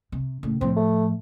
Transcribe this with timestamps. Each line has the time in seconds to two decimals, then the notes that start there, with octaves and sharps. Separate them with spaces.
0.12 C3
0.43 A2 C#3
0.61 A2 F3 C4
0.77 A3